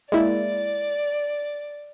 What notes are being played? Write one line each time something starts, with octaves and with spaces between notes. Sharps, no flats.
G#3 A#3 E4 D5